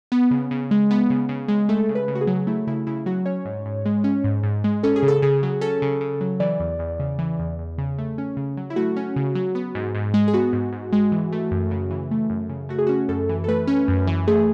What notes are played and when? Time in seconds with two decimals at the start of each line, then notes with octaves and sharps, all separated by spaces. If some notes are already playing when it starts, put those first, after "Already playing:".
0.12 B3
0.31 C#3
0.51 C#3
0.71 G#3
0.91 B3
1.10 C#3
1.29 C#3
1.48 G#3
1.69 A3 A4
1.89 C#3
1.95 B4
2.08 C#3
2.15 F#4
2.21 G#4
2.27 F#3
2.47 A3 E4
2.67 C#3 E4
2.87 C#3 E4
3.06 F#3 F#4
3.26 C#4 C#5
3.45 G#2
3.66 G#2
3.86 G#3
4.04 C#4
4.24 G#2
4.43 G#2
4.64 G#3
4.83 C#4 A4
4.96 G#4
5.03 C#3
5.08 A4
5.22 C#3 G#4
5.43 F#3
5.61 C#4 A4
5.82 C#3
6.01 C#3
6.21 F#3
6.40 E3 D5
6.60 E2
6.79 E2
6.99 C#3
7.19 E3
7.39 E2
7.59 E2
7.78 C#3
7.98 A3
8.18 C#4
8.37 C#3
8.57 F#3
8.70 E4
8.76 A3 F#4
8.96 C#4
9.16 C#3
9.35 F#3
9.55 B3
9.75 G#2
9.95 G#2
10.14 G#3
10.28 G#4
10.33 B3 F#4
10.53 G#2
10.72 G#2
10.93 G#3
11.12 E3
11.33 A3
11.51 F#2
11.71 C#3
11.91 E3
12.11 A3
12.30 F#2
12.49 C#3
12.69 A3 F#4
12.79 G#4
12.87 C#4 F#4
13.09 F#2 A4
13.29 E3
13.44 A4
13.48 A3 B4
13.67 C#4
13.88 F#2
14.07 E3
14.27 A3 G#4